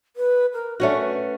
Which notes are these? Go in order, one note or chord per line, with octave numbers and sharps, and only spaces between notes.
B4
A#4
A3 C#4 D4 F#4
B4